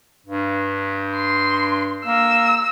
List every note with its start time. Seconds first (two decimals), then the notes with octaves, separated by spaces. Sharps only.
0.26 G2
1.15 C6
2.06 A#3 E6